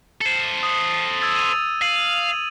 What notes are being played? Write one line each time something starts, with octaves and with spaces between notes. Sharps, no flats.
A4 C5
D#6
E6 G#6 A6
D#7 F7
F5 D#7 F7 F#7
F7